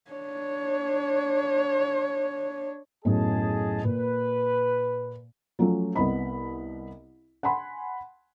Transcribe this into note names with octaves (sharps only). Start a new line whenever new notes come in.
D4 C#5
B1 F#2 A2 G#4 D#5 A5
A#2 B4
F3 F#3 A3 C#4
C2 B3 C4 D#5 B5
F#5 G#5 B5 C6